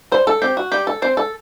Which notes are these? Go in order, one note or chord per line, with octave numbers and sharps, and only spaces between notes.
G3 C5
A4
C4 G4
F#4
G3 G4
A4
C4 C5
A4